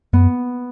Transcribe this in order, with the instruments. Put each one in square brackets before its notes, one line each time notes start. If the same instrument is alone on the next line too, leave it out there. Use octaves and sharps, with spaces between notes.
[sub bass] F#2 [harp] B3